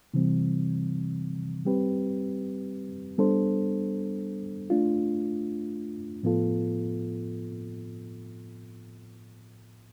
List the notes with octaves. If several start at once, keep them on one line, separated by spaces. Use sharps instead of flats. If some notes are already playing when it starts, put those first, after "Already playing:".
C3 E3 G3 C4
G3 C4 G4 B4
G3 B3 D4 A4 C5
A3 D4 F4
A2 F3 B3 F4 A4